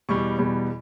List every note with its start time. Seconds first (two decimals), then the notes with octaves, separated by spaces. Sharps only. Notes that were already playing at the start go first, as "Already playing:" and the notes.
0.09 E2 B2 G3 C#6
0.39 E2 B2 G3